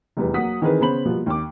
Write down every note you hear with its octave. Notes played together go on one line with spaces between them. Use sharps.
F1 E2 G3 B4
F#3 A#3 F#5 D#6 B6
D#3 E3 C4 G#4 A#4 B4
C#3 B3 C5 B5 F#7
B2 F3 G3 A#3 B3
D#2 D6